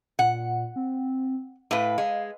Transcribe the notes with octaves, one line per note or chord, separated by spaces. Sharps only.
A#2 F#5
C4
A2 B4 F5
G#3